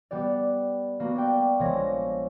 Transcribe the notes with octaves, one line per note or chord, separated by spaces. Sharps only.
G3 B3 G4 D5
A#3 B3 F#4
D5 G5
A#1 F3 G#3 C#5 A#6